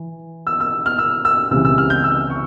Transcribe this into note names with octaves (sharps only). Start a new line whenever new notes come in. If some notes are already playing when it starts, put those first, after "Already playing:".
Already playing: E3
E6
E6
F6
E6
E6
C#2 C3 E3 E6
E6
F6
G6
E6
C#6